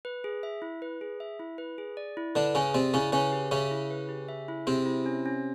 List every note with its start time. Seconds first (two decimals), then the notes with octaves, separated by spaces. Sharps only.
0.05 B4
0.24 G#4
0.43 E5
0.62 E4
0.82 B4
1.01 G#4
1.20 E5
1.39 E4
1.58 B4
1.78 G#4
1.97 D5
2.17 E4
2.35 D3 D4 B4
2.55 C#3 C#4 G#4
2.74 C3 C4 D5
2.94 C#3 C#4 E4
3.12 C#3 C#4 B4
3.32 G4
3.51 C#3 C#4 E5
3.71 E4
3.91 B4
4.09 G4
4.29 E5
4.48 E4
4.67 C3 C4 G#4
4.86 E4
5.06 C#4
5.26 C#4